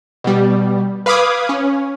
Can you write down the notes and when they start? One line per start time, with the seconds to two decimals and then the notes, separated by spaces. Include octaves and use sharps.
0.24 B2 G3
1.06 B4 F5 B5 D6 D#6 G#6
1.49 C#4